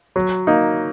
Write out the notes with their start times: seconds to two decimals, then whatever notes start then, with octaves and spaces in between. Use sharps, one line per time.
0.16 F#3
0.47 A#3 D#4